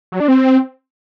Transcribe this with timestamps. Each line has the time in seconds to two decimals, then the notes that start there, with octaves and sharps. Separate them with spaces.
0.12 F#3
0.20 D4
0.28 C4